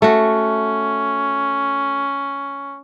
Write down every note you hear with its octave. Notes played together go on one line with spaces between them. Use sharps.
A3 C#4 F#4